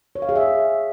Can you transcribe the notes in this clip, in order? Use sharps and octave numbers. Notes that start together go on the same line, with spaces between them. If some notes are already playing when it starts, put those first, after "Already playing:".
C#5
F5
G#4
E5